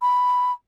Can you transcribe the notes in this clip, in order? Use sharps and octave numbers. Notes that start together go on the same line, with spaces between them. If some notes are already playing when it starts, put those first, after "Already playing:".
B5